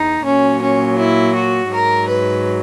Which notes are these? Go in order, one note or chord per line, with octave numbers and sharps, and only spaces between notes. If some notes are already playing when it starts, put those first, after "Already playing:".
Already playing: E2 D#4
A#2 F#3 C#4
C#4
E4
F#4
G#2 F#3 A#4
B4